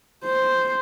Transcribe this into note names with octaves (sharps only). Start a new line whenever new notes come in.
C5